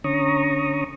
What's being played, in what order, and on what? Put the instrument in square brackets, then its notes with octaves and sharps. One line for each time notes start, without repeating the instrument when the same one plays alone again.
[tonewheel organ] D3 C#4 A#5 C#6 D#6